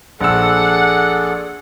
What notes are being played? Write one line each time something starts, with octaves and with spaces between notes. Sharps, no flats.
A#1 G#4 A4 D5 F#5 E6